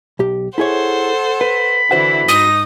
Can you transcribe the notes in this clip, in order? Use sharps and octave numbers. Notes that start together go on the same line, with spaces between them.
B1 G4
E4 G#4 A4 C5 C#5 F#5
B4 B5
D3 E3 E4 F#4 C5 F#5
G#2 D#4 D#6 A#6